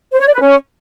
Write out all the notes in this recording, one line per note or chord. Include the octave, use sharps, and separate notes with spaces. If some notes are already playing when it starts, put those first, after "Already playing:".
C5
C#5
D5
B4
C#4